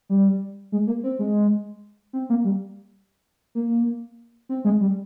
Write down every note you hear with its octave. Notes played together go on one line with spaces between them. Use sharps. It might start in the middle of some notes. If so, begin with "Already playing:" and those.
G3
G#3
A#3
C4
G#3
C4
A#3
G3
A#3
C4
G#3
G3